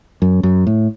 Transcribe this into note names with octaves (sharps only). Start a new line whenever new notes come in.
F#2
F#2
A2